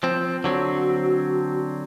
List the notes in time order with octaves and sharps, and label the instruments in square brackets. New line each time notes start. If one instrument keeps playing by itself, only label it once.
[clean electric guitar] F3 C4
[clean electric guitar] D3 F#3 C4 [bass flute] F#4